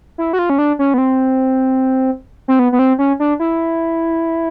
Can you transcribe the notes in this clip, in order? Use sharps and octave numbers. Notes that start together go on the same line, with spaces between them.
E4
F#4
F4
C#4
D4
C#4
B3
C4
C4
B3
B3
C4
C#4
D4
E4